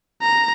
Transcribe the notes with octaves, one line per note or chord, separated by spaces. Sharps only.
A#5